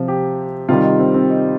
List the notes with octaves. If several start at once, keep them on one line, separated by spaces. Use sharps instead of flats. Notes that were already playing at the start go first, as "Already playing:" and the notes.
Already playing: C3 F3
G4
C3 D#3 G3 F4
D#4
C4
C4
D#4